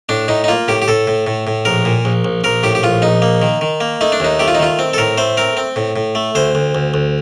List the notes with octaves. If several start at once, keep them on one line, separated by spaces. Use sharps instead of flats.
A2 D4
A2 D#4
D#4
A#3 F4
A2 G4
G4
A2 A4
A2
A2
A2
A#1 A#4
A#2
A#1
A#1
A#1 A#4
A2 G4
G4
A#1 F4
A#1 D#4
A#3
D#3
D#3
A#3
A3 D#4
D4
D#2 D#4
A3 G4
F4
D#4
D#3 F4
C4
A4
A2 A#4
A3 C5
C4 A#4
C4
A2
A2
A3
D2 C5
D2
D2
D2